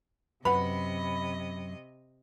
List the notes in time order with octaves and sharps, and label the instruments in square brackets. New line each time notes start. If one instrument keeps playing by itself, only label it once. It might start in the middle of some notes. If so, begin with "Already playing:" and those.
[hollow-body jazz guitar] F#2 F#5 [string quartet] C3 D#5 [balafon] B4 [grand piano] B5